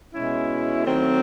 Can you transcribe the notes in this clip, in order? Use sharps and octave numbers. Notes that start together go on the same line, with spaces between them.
B2 G#3 C#4 E4
D#3 F#3 A3 C4